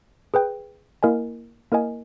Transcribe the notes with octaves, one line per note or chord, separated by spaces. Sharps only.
G#4 B4 G5
A#3 E4 A#4 D#5 G#5
A#3 E4 A#4 D#5 G#5